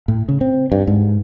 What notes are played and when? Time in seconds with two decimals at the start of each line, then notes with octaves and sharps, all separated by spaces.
0.08 A2
0.29 C#3
0.41 C4
0.72 G2
0.87 G#2